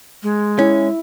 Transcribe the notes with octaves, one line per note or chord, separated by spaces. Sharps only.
G#3
C#4 E4